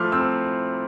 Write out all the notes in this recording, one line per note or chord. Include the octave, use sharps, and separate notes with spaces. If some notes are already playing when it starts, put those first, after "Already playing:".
Already playing: F3 A3 E4 C6 D6 F6
C4 E6